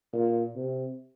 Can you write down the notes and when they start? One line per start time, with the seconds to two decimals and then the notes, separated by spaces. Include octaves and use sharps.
0.13 A#2
0.56 C3